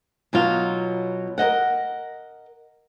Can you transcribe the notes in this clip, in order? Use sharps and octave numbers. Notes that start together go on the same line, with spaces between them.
B2 F#3 D#4 F4
A#4 C5 D#5 F#5